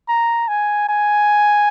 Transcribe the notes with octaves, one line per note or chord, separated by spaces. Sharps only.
A#5
G#5
G#5